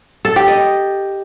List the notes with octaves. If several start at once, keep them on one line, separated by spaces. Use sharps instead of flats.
A4
G4
D#5